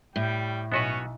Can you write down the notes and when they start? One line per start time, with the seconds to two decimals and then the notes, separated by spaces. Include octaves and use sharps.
0.16 A2 G3 G5
0.72 B1 B3 C#4 F#4 B4 C#5